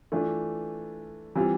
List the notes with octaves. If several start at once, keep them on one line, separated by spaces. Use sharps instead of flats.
E3 A3 D4 F4
E3 G3 C4 F4